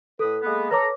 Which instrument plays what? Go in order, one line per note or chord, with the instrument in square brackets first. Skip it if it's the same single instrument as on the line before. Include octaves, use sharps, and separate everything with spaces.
[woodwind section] A2 B4 D#6 [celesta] A4
[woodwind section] G#3 A#3 B3
[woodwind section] A4 A#5 [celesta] B4 C#5 D6